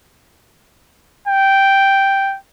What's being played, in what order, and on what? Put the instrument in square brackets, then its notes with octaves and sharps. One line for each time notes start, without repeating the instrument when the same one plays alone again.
[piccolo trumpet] G5